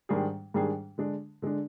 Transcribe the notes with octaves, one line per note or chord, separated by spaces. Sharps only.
G#2 D#3 G3 D4 G#4
G#2 D#3 G3 D4 G#4
D3 G#3 D4
D3 G#3 D4